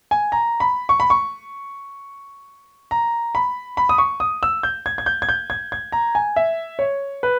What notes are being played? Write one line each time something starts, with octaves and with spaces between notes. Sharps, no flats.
G#5
A#5
B5
C#6
B5
C#6
A#5
B5
B5
D#6
C#6
D#6
E6
G6
G#6
G#6
G6
G#6
G6
G#6
G#6
A#5
G#5
E5
C#5
B4